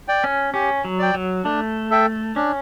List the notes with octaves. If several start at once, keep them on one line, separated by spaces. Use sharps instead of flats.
D5 G5
C#4
C#4 G4
F#3
D5 G5
F#3
A3 D4
A4 E5 G5
C#4 D4